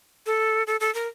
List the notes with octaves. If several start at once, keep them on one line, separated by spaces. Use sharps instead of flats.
A4
A4
A4
A#4